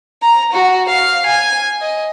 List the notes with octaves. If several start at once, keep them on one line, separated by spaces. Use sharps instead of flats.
A#5
F#4
F5
G#5
D#5